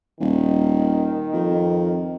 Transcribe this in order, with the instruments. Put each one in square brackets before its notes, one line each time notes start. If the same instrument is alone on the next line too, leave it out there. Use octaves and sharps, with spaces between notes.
[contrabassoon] D#1 [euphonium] D#3
[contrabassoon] F2